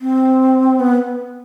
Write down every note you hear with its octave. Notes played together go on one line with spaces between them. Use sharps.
C4
B3